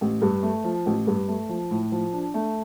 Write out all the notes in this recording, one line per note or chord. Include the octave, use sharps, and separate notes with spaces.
A1
G2
A3
F3
A1
G2
A3
F3
A2
F3
D4
A3